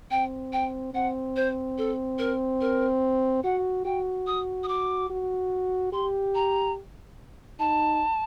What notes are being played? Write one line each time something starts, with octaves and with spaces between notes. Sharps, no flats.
C4 G5
G5
C4 F#5
C5
A4
A#4
A#4
F#4 F#5
F#4 G5
D#6
D#6
D6
F#4
G4 C6
A#5
D#4 A5